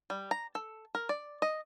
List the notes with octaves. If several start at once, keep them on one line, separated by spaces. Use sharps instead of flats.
G3
A#5
A4
A#4
D5
D#5